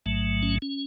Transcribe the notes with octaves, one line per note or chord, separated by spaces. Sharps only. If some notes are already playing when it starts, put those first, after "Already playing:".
A1 G#2 F#3 A3
C#4
C#4